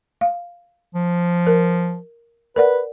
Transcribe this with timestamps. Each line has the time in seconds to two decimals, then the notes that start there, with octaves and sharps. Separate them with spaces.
0.21 F5
0.95 F3
1.47 A#4
2.56 A#4 B4 D5 F#5